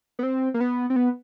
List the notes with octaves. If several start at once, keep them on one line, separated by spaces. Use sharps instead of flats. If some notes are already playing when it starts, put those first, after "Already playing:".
B3
C4
A#3
B3
C4
B3